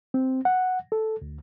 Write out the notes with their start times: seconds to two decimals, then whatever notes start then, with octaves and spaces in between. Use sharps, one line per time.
0.14 C4
0.45 F#5
0.92 A4
1.22 D2